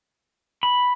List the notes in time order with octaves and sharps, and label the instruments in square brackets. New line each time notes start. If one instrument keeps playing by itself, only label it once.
[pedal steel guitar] B5